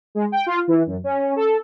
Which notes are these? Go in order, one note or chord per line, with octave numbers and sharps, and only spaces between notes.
G#3
G5
F4
E3
F#2
C#4
A4